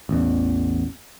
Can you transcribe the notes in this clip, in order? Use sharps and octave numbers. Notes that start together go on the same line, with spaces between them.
A1 E2